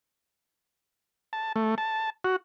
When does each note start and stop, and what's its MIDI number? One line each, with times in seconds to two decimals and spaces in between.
1.33 1.52 81
1.56 1.75 57
1.78 2.10 81
2.24 2.36 66